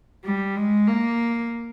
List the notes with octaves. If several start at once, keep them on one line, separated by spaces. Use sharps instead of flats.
G3
G#3
A#3